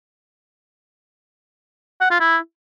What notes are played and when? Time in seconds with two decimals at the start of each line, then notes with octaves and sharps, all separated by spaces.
2.01 F#5
2.10 F4
2.20 E4